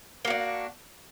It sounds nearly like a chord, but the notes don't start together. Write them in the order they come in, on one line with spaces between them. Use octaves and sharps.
A#3 F#4 D4